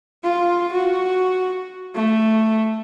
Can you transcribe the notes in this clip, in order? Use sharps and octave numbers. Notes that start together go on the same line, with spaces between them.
F4
F#4
A3